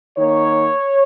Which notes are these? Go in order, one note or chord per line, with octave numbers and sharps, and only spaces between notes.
D#3 A#3 C#5